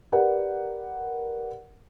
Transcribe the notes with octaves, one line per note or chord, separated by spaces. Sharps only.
G4 A#4 B4 D5 F#5